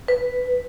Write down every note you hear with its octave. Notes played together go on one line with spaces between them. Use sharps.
B4